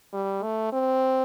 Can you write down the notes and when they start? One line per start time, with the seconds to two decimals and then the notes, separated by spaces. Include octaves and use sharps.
0.13 G3
0.43 A3
0.73 C4